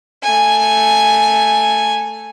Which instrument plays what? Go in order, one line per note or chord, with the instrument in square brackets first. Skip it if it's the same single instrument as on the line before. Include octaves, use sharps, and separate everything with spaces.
[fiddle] A3 G#5